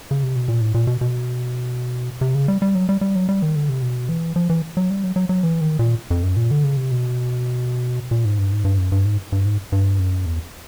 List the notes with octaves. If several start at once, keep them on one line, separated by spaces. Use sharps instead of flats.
C#3
C3
B2
A#2
A2
A#2
B2
B2
C3
C#3
G3
G3
F#3
G3
G3
F#3
G3
D#3
D3
C3
B2
E3
F3
E3
F#3
G3
F#3
F#3
F#3
E3
D#3
A#2
F2
F#2
A#2
D3
C#3
C3
B2
A#2
G#2
G2
G#2
G2
F#2
G2
G#2
G2
G#2
G2
F#2
E2